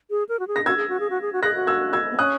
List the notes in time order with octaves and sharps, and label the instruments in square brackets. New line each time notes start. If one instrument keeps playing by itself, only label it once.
[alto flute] G#4
A#4
F#4
G#4
[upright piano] A#6
[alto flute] F#4 [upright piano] E6 G#6
[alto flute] G#4
F#4
G#4
F#4
G#4
F#4
[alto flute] G#4 [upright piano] F#6 A#6
[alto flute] F#4
[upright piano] E6 G#6
E6 G#6
[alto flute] B3
[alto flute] C#4 [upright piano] D#6 F#6